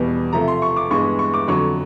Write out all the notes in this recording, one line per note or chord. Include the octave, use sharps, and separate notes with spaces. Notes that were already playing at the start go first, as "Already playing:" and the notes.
Already playing: E2 B2 G3 B3
C3 F3 A3 A#5
C6
C#6
D6
G2 E3 G#3 B3 C#6
C#6
D6
F2 D3 F#3 C#6